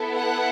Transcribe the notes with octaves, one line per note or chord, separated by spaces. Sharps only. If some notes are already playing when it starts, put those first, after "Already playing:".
Already playing: B3 E4 A4
F#5